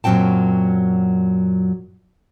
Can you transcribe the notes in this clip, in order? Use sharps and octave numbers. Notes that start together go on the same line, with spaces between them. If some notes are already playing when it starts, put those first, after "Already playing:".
F#2 A#2 F#3 C4 G5 A5